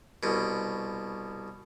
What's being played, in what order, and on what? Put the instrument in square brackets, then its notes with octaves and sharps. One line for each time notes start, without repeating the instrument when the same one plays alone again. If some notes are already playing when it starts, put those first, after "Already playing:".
[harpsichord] C2 B2